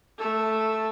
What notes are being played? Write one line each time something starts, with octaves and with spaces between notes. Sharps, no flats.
A3 A4